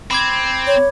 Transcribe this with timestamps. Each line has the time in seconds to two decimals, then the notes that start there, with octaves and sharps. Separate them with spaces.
0.11 C4 B5 D6 G#6
0.67 C#5